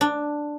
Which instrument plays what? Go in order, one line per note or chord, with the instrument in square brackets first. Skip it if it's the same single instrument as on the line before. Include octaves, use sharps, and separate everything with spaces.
[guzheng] D4